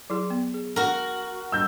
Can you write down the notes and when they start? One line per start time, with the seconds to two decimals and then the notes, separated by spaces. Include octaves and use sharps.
0.10 F#3 E4 G#4
0.30 B3
0.54 G#4
0.76 F#4 A#4
1.52 G3 D4 E6 G6